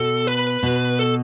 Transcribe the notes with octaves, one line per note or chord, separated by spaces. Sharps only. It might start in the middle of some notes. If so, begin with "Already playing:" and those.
Already playing: B2 A4
B4
B2
A4